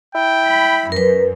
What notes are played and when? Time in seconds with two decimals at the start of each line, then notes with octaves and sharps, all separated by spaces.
0.15 E4 G5
0.45 B5
0.92 F#2 A#4 B4